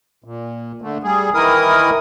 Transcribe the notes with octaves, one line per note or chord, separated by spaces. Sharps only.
A#2
D3 A3
G3 G#4
D#3 E3 E4 A#4 D#6